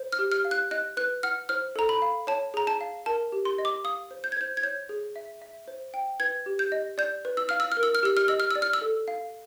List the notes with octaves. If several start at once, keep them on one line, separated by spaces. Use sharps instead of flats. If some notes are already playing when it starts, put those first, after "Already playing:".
Already playing: C5
F6
G4
F6
F5
F#6
D#5 F#6
B4 F#6
F#5 F6
C5 F6
A4 A#5
B5
F5
C#5 A5
G#4 A#5
A5
F5
A#4 A5
G4
C6
D#5
D6
F5 D#6
C5
G6
G#6
C5 G6
G#6
C#5 G6
G#4
E5
E5
C5
G5
B4 G#6
G4
G6
D#5
D5 G6
B4
E6
F5 F6
E6
F6
A#4
E6
F6
G4 E6
F6
D#5 E6
F6
D5 E6
F6
E6
A4
F5